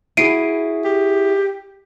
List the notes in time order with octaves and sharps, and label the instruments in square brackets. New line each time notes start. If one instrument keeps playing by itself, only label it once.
[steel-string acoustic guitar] E4 F#4 G#4 [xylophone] C7 D7 D#7
[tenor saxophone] G4